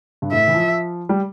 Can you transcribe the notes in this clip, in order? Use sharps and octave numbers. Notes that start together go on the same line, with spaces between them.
G2
A2 E5
E3
F3
G3